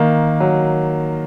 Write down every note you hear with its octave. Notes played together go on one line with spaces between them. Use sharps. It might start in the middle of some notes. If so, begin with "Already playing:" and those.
Already playing: D#3 A#3
F#3